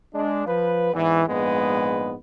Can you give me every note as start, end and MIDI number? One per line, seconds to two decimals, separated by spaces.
0.14 0.42 56
0.14 0.42 62
0.46 0.93 53
0.46 0.93 71
0.94 1.23 40
0.94 1.23 44
0.94 1.23 52
1.28 2.14 34
1.28 2.14 44
1.28 2.14 56
1.28 2.14 59
1.28 2.14 71